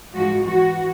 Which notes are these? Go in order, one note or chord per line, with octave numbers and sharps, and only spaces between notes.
G#2 F3 F#4
E3 F#4